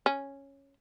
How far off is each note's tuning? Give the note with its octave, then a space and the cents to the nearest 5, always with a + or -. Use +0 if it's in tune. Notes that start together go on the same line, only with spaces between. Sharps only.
C#4 -5